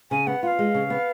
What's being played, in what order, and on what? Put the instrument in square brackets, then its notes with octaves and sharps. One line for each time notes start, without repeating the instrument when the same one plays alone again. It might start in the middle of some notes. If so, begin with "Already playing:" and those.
[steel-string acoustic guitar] C#3 [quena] G#5
[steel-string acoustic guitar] B3 [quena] F#5
[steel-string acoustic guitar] F4 [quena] F#5
[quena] F5
[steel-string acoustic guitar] G#3
C#3
B3